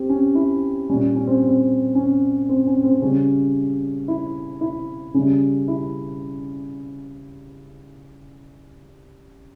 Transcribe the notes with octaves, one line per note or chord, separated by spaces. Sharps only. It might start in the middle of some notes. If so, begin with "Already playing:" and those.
Already playing: C4 G4
C#4
E4
A#2 G3 C#4
C#4
C4
C4
C#4
C4
C#4
C4
C#3 G3 C#4
E4
E4
C#3 G3 C#4
E4